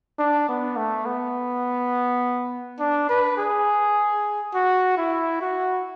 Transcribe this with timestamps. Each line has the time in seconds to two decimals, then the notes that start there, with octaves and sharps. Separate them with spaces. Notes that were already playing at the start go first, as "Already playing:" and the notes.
0.19 D4
0.49 B3
0.77 A3
1.05 B3
2.79 D4
3.09 B4
3.37 G#4
4.55 F#4
4.97 E4
5.41 F#4